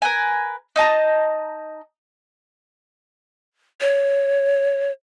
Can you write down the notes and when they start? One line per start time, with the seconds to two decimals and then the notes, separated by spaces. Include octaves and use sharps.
0.02 A#4 B4 G#5
0.76 D#4 D#5 A5 A#5
3.81 C#5